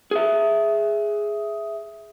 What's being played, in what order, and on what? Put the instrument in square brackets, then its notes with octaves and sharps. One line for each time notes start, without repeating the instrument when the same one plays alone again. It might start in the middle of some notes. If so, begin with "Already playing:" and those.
[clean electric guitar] G#4 E5